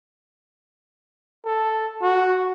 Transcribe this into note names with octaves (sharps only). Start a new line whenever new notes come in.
A4
F#4